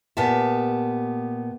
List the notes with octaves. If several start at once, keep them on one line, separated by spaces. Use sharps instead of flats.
A#2 B3 G4 E5 A5